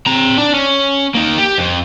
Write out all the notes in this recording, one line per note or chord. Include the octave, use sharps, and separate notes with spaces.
C4 A#5
D4
C#4
A#3 D#4
G4
F2